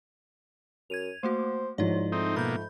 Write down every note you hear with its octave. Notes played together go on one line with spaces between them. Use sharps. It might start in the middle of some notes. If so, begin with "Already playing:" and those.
F#2 G#6 D#7 F7
A3 A#3 F#4 C5
G#2 F3 F#3 E4 D5
A3 C4 D#4
B2 A#3 B5 G6